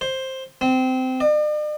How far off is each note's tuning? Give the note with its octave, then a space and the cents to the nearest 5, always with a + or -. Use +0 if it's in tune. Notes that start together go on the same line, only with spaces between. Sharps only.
C5 +10
C4 -20
D5 +45